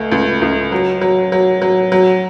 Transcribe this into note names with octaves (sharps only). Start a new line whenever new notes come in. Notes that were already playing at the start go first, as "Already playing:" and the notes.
Already playing: C#2 A3
C#2
C#2
F#3
F#3
F#3
F#3
F#3